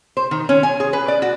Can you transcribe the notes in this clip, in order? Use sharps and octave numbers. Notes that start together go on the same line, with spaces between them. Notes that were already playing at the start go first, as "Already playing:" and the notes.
C5
D#3
C#4
G#5
G#4
B4
D5
F#4